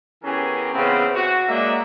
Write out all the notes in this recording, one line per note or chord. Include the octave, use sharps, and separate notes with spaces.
E3 B3 C#4 G4 G#4 A#4
C#3 E3 B3 C4
F#4
F#3 G#3 A#3 D4 D#5 E5